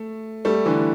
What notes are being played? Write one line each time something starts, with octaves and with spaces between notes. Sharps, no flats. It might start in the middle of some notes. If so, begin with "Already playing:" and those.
Already playing: A3
G3 A3
D3 E3